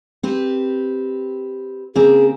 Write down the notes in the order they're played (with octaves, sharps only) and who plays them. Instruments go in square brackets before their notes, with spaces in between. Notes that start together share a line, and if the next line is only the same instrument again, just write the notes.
[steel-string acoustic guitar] C4 G4 B4
[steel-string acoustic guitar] C#3 A#3 C4 [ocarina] G#4